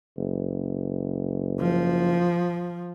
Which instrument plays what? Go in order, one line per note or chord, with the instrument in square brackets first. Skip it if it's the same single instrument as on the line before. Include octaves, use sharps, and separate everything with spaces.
[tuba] F#1
[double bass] F3